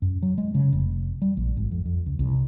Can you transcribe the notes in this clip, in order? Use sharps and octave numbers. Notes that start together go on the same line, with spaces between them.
F#2
F#3
G#3
C#3
F1
G3
A#1
G#1
F2
F2
C#2
C2